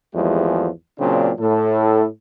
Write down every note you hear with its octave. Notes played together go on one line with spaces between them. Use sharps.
G#1 E2 F3 G#3 A3 G4
A#2 C#3 F#3 C4 D4
A2 A4